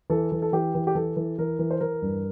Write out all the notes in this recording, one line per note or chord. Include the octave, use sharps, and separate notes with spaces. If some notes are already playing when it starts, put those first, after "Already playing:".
E3 A4
E3
A4
E3 G4
E3
G4
E3 A4
E3
E3 A#4
E3
C5
E3 A#4
G2